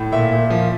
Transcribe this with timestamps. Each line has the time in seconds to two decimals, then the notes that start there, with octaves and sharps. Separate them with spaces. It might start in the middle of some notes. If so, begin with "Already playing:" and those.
Already playing: A2
0.12 A#2 E5
0.32 A#2
0.50 F3